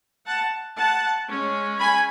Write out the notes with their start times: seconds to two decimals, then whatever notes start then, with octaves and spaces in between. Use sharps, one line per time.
0.26 F#5 A5
0.78 F#5 A5
1.29 G#3 C#4
1.80 G#5 B5